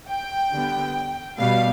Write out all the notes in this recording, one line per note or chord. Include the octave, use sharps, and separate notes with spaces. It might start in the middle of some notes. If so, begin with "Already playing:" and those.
G5
D3 G3 B3
B2 G3 B3 F5